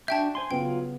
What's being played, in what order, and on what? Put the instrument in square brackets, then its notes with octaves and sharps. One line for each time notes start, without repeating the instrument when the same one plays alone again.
[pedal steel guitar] D4 F#4 G6 [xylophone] E5 G5 A5
[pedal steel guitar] C5 G#5 C6
[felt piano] C#3 B3 [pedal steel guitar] F#3 F4 [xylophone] G5